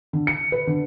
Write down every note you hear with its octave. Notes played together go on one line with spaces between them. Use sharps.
D3
C#7
B4
D3